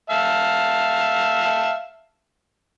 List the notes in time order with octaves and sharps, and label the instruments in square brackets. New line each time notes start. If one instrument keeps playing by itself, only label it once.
[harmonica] E5 F5 A5